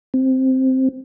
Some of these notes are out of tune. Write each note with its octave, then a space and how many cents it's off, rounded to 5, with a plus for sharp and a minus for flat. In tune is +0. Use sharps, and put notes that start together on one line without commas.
C4 +0